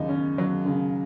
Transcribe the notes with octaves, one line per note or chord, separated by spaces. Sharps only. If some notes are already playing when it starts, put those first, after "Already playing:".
Already playing: D#2 C#3 F#3 D#4
C#4
F#3
C#3